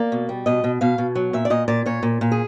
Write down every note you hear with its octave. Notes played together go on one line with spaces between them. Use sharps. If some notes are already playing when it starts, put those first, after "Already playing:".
Already playing: A#3 D5
B2
G3
B2 D#5
B2
B2 F5
B2
F#3
A#2 E5
D5
A#2 D#5
A#2 D5
A#2 C#5
A#2
A#2
G#4